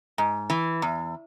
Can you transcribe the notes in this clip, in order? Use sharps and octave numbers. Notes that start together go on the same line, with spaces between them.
G#2
E3
E2